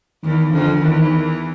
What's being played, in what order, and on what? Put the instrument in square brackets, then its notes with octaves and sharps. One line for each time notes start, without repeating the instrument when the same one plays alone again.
[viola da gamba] E2 E3 [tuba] D#3
[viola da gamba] F2 F3 [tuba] D3
[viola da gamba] E2 E3 [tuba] D#3